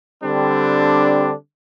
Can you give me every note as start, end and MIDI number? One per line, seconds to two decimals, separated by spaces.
0.24 1.33 50
0.24 1.33 55
0.24 1.33 60
0.24 1.33 62